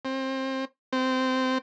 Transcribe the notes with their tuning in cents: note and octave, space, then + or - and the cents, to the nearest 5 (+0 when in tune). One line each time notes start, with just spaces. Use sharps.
C4 +25
C4 -15